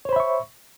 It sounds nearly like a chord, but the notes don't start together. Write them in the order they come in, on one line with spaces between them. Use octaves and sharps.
C#5 C5 B5 E5 C#6